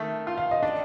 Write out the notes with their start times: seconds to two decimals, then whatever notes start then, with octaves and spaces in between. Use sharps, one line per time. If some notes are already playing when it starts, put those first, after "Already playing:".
Already playing: D#3 A3
0.27 F4
0.38 F5
0.51 D#5
0.63 D4 D5